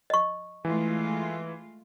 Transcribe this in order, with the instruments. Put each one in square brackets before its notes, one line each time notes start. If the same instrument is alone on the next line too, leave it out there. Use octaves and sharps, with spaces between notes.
[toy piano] D#5 C#6
[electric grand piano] E3 [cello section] G#3 A3 F4